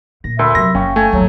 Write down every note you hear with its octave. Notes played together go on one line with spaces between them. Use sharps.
A#2 A#6
D2 A#4 E5 B5 C6
C3 F#3 A#6
F#1 C#4 F5 G5 C#6
A3 G#5
G#1 D#2 F#3